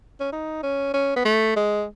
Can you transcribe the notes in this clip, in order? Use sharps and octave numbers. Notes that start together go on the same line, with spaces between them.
C#4
D#4
C#4
C#4
B3
A3
G#3